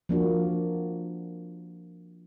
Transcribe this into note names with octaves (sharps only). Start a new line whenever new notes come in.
F3 A#3 D4 F#4